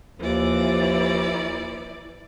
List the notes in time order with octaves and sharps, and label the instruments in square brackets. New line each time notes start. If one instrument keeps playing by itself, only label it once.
[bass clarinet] D#2 [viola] E3 D5 [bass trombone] F3